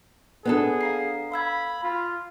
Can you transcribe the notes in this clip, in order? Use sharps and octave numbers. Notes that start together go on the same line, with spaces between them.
B3 D4 G#4 A4
F5 A#5 C7
F5 B5 E6 G#6
F4